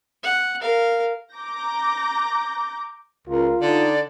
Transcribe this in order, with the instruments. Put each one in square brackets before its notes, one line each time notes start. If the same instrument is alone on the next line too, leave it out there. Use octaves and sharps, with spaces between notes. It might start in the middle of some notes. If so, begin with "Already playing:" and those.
[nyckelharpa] F#5
A#4 F5
[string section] A#5 D6 G6 A#6
[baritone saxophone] C#2 [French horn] F4 [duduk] A#4
[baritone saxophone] D3 [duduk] D#4 [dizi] D5